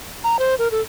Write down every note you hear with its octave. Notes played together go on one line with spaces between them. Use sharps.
A#5
C5
A#4
A4